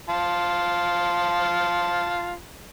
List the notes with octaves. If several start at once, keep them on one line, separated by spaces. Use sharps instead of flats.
F4 A5